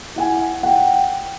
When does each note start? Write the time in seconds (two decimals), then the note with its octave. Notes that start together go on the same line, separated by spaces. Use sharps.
0.16 E4 F#5 G#5
0.63 F#5 G5